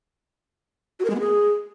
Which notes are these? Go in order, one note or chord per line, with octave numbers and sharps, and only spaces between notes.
F#4
A#4
G#3
B3
G#4